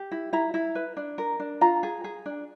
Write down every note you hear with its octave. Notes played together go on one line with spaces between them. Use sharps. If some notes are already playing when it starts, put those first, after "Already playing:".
Already playing: G4
E4
E4 A#5
E4
B4
D4
A#4
D4
F4 A#5
G#4
G#4
D4